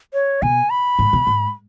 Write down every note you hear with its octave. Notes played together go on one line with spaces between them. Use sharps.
C#5
B2 G#5
B5
G#2
B2
G#2